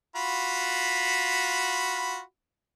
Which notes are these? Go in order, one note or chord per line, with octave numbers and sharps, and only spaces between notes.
F4 F#4 B5